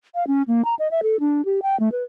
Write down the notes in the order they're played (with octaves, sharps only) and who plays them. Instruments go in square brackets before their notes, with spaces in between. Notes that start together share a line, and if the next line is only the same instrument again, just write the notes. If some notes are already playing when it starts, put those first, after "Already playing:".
[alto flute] F5
C#4
A#3
A#5
D#5
E5
A4
D4
G4
G5
A3
B4